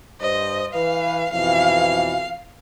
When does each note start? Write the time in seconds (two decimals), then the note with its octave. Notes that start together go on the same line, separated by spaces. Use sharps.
0.21 G2 C5 D#5
0.74 E3 B4 F5
1.33 F2 B2 E3 F5